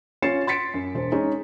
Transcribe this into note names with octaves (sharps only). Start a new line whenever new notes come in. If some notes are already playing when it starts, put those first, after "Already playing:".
C#4 F4 A6 C7 C#7 E7
C6 A6 B6 C#7 D7
F#2
E1 C5
G#3 C#4 D#4